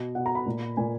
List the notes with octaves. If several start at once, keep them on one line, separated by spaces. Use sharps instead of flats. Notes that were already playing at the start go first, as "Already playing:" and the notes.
Already playing: B2
B2 F#5
A#5
B5
A#2
A#2 G#5